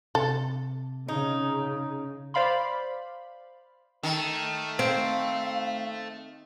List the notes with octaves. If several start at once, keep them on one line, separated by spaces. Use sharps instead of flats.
C3 A4
C#3 D#4
C5 D5 F5 B5 C6
D#3 A3 A4
C4 F5